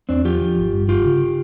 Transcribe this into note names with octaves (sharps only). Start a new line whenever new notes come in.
E2 C4 D4
F3 F4 G4
F3
G#1
G2
F#1 F4 G4
C#3